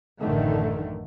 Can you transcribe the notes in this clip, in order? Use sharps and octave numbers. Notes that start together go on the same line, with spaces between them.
A1 F#2 A2 D3 D#3 A3